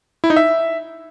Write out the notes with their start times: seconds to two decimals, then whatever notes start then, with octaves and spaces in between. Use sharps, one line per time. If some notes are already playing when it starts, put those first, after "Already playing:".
0.24 E4
0.30 D#4
0.36 E5